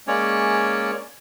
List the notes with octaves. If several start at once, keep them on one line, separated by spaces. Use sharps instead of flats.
G#3 A#3 C#4 C#5 D5